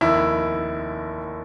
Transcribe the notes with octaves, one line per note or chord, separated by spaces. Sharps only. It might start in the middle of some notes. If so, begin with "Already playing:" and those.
F1 D#2 D#3 E4